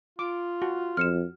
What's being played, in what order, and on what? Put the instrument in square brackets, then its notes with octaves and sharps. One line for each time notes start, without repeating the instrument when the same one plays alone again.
[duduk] F4 [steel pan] D6
[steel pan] F#4
[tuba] F2 [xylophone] F6 C#7 E7